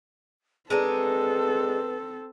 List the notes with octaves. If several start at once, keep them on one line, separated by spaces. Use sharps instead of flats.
G#3 C4 D4 D#4 A4 B4